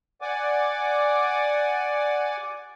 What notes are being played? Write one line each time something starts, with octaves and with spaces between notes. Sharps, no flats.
D5 F#5 G#5 D6